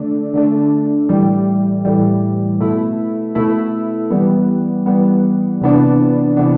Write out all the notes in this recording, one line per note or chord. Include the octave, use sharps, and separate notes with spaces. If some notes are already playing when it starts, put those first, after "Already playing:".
Already playing: D3 A3 D4
D3 A3 D4
A2 E3 G3
A2 E3 G3
B2 A3 E4
B2 A3 E4
E3 G3 B3
E3 G3 B3
C3 E3 B3 D4
C3 E3 B3 D4